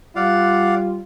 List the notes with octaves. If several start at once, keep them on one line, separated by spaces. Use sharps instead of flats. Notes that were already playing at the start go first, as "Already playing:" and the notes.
G3 F4 D5 F5 F#5